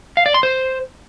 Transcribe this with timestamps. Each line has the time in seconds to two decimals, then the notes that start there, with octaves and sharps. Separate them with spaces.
0.17 F5
0.26 D5
0.34 C6
0.43 C5